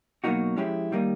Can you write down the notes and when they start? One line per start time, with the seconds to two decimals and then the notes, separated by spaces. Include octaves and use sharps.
0.24 B2 F#3 A#3 D#4 F#4
0.57 F3 G#3 C#4 E4 G4
0.92 D#3 G3 A#3 D#4